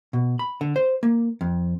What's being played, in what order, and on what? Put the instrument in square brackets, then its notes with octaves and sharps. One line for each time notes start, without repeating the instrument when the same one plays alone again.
[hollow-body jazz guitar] B2
B5
D3
C5
A#3
F2